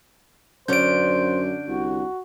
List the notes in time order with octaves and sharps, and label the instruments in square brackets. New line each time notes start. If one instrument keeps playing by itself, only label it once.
[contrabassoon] F#2 [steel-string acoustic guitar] D3 C#4 D4 [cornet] C5 [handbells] G6 D7
[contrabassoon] C2 [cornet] F#4